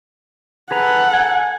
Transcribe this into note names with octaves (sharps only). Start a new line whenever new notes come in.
G#4 A4 B4 F#5 A#5
G#5